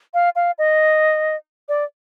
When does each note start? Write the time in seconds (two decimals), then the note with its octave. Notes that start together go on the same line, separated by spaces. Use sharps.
0.14 F5
0.36 F5
0.58 D#5
1.69 D5